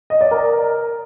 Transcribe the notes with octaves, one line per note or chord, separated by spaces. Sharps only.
D#5
D5
A#4